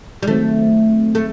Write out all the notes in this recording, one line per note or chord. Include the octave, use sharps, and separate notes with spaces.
G3
D#3 F#3 A3 C4
A3